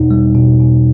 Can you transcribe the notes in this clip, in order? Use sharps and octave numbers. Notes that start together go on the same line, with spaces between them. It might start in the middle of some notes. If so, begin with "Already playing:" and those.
Already playing: E2 B2 D#4
G3
B2
B2